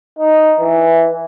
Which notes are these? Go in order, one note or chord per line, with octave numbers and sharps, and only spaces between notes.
D#4
E3